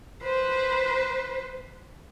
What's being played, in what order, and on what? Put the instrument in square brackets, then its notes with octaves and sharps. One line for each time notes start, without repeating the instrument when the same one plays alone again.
[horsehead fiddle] B4 C5